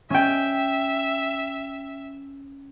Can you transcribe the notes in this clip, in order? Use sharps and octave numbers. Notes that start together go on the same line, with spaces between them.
C#4 E5 G5